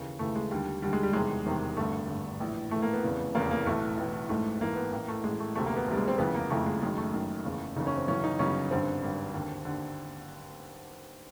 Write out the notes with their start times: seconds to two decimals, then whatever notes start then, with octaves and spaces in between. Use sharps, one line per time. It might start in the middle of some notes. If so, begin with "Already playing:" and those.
Already playing: D#2 C#3 E3
0.19 D#2 C#3 E3 A3
0.36 G#3
0.51 D#2 D3 G3
0.82 D#2 D3 G3
0.93 G#3
1.03 G3
1.13 E1 E2 C3 D#3 G#3
1.45 E1 E2 C3 D#3
1.77 G#1 G2 D3 A3
2.08 G#1 G2 D3
2.40 A#1 A2 E3
2.71 A#1 A2 E3 A3
2.82 A#3
2.93 B3
3.03 F1 E2 C#3 E3
3.34 F1 E2 C#3 E3 A#3
3.51 A#3
3.66 B1 A2 E3 A3
3.97 B1 A2 E3
4.29 A1 G#2 E3 A3
4.61 A1 G#2 E3 A#3
4.76 B3
4.92 A1 A2 E3 A#3
5.08 A3
5.24 A1 A2 E3 G#3
5.40 A3
5.55 E1 D2 C3 A3
5.66 A#3
5.76 B3
5.87 E1 D2 C3 G3
5.97 G#3
6.08 C4
6.18 F#1 F2 C#3 E3 B3
6.34 A#3
6.50 F#1 F2 C#3 E3 A3
6.66 G#3
6.81 F#1 F#2 D#3 G#3
6.97 A3
7.13 F#1 F#2 D#3
7.45 F#1 E2 C#3
7.76 F#1 E2 C#3 D#4
7.87 C#4
7.97 C4
8.08 G1 F#2 C#3 E3 C#4
8.24 D#4
8.39 G1 F#2 C#3 E3 C#4
8.71 G#1 G2 D3 C4
9.02 G#1 G2 D3
9.34 D#2 D3
9.65 D#2 D3